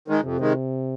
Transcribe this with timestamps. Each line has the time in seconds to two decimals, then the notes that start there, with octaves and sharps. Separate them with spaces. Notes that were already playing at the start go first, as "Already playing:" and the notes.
0.08 D#3 G#3
0.23 F2 C3
0.40 D#3 G#3